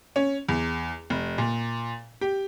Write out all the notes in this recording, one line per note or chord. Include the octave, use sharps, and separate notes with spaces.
C#4
E2
F1
A#2
G4